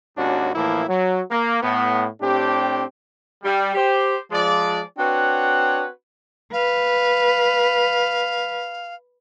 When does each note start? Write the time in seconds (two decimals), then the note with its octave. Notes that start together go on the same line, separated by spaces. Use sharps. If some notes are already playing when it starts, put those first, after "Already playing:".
0.17 G#1 D#2 C#4 D4 F#4
0.55 A2 E3 F3 A#3 E4
0.88 F#3
1.31 A#3
1.63 A2 B3
2.21 A2 C4 D4 G4
3.44 G3
3.75 G4 C5
4.32 F3 G#3 D5
4.99 C4 D4 F#4 B4 C#5 F#5
6.53 B4 F5